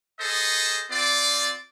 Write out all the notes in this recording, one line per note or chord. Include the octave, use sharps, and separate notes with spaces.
G#4 A4 C5 D#5
C4 F4 D5